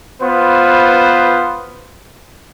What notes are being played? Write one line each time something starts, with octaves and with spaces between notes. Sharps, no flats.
B3 F4 B4 C5